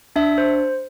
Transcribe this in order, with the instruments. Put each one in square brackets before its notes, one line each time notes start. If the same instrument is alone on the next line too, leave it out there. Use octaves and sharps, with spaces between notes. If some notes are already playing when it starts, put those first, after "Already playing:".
[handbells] D4 E5
C5